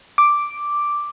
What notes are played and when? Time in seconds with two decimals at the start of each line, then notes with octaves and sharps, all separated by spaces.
0.18 D6